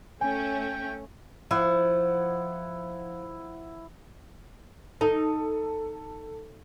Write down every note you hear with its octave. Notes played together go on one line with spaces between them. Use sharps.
A3 C#4 G5 G#5
G5
F3 E4 F#5
D#4 A4